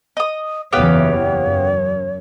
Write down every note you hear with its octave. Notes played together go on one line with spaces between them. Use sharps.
D#5 D#6
F#1 E2 E3 B3 G4 C#5 F5
F#2